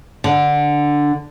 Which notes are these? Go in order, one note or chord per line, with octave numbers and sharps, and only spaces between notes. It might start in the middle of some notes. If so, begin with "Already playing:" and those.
D3